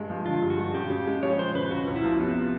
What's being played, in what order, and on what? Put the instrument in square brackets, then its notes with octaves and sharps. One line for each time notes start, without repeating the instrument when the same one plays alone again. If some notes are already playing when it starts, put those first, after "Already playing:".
Already playing: [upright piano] G2 G#3
F3
[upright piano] D3 [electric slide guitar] F4
[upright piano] G2
[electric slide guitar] F#4
[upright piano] G#3
[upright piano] C#3 [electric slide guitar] G4
[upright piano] C#3
G#3
[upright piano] F3 [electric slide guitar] C#5
[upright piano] C#3 [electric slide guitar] C5
[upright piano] C#3 [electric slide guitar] B4
[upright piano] C#2 [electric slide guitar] F#4
[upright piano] C#2
[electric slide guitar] E4
[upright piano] F3
[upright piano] C3 [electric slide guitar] B3